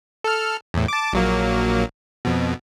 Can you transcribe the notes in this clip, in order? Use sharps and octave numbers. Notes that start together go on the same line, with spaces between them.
A4 F6
E2 A2
A5 D6
A#1 F#3 A#3
F2 B2